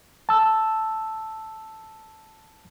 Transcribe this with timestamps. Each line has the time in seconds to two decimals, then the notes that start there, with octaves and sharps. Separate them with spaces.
0.29 A5 E6